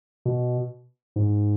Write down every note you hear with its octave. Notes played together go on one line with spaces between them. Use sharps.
B2
G#2